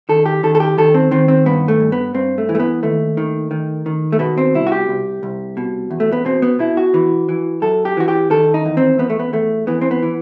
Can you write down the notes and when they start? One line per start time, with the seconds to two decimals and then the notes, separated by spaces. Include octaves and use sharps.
0.09 D#3 A4
0.26 G4
0.43 D#3 A4
0.55 A4
0.60 G4
0.78 D#3 A4
0.94 C4
1.11 D#3 C4
1.28 C4
1.46 G2 B3
1.68 A3
1.80 G2
1.92 B3
2.14 G2 C4
2.38 A3
2.49 E3
2.55 A3
2.60 B3
2.83 D#2 A3
3.17 D#3
3.51 D#3
3.86 D#3
4.12 A3
4.19 B2 B3
4.38 C4
4.54 C2 E4
4.67 F#4
4.72 G4
4.89 C2
5.23 C2
5.57 B2
5.91 E2
6.00 A3
6.12 B3
6.25 B2 C4
6.42 B3
6.59 B2 E4
6.77 F#4
6.94 E3
7.29 E3
7.62 F#2 A4
7.85 G4
7.97 E3 F#4
8.08 G4
8.30 D#3 A4
8.54 D#4
8.65 E2
8.77 C4
8.99 E2 B3
9.10 A3
9.19 B3
9.33 E2 A3
9.67 E3 B3
9.81 C4
9.91 B3
10.03 E3